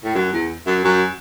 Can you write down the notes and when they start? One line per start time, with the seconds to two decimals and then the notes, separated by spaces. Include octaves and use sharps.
0.05 A2
0.15 F#2
0.33 E2
0.67 F#2
0.84 F#2